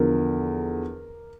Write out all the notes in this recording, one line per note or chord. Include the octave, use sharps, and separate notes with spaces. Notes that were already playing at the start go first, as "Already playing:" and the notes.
Already playing: E2 D3 F3 A#4